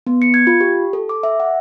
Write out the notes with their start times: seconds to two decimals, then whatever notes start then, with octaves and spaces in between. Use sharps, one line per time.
0.07 B3
0.22 C#7
0.34 G#6
0.47 F4
0.61 G4
0.93 A4
1.09 D6
1.23 E5
1.40 F#5